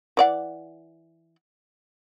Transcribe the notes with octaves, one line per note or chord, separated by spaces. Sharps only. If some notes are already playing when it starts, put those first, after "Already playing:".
E3 D5 F#5